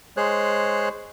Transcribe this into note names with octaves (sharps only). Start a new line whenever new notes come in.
G#3 G#4 C5 C#5 F#6